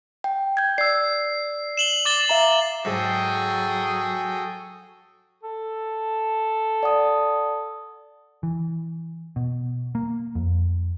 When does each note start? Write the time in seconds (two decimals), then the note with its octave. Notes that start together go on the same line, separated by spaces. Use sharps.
0.24 G5
0.57 G6 G#6
0.78 D5 E6 C7
1.77 E7 F#7 G7
2.05 D6 A6 G7
2.29 E5 F5 A#5
2.85 G#2 F#3 F#4 G#4 A4 G5
5.44 A4
6.83 D5 F#5 D#6
8.43 E3
9.36 B2
9.95 A#3
10.35 F2